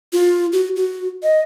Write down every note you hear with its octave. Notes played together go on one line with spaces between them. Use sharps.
F4
F#4
F#4
D#5